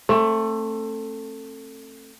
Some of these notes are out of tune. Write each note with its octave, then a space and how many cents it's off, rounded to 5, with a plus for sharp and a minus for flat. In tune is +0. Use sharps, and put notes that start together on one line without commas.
A3 +15 C4 +35